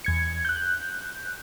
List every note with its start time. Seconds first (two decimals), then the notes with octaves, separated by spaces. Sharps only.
0.04 E2 G#6 C#7
0.45 F#6 G6